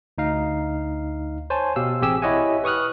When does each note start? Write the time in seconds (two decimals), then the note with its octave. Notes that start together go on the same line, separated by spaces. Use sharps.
0.18 D2 D#4 F5
1.50 C5 C#5 G#5 A5
1.76 B2 G4 F5 E6
2.02 A1 C4 G4 G#4 G#5 E6
2.22 E4 G4 C#5 D#5 F#5 G#5
2.64 B4 C#6 D#6 F6 F#6